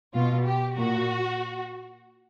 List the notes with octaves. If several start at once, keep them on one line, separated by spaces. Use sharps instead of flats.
B2 F4
G4
A#2 F#4